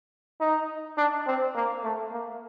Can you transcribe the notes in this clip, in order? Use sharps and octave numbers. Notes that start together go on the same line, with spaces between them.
D#4
D4
C4
A#3
A3
A#3